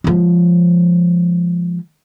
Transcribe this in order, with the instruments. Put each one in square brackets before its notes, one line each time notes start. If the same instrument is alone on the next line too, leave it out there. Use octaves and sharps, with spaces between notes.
[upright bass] F3 G#3